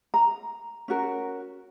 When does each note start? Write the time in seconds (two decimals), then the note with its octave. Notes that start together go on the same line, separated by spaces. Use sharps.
0.14 A#5
0.88 C#4 F#4 A#4